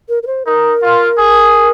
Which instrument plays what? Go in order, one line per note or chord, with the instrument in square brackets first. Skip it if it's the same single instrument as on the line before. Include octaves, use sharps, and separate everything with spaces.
[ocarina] A#4
A#4
C5
[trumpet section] D#4 [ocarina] A#4
[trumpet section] F4
G#4